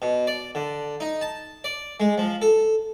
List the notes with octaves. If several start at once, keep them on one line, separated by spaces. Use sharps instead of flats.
B2
D5
D3
D#4
A5
D5
G#3
F3
A4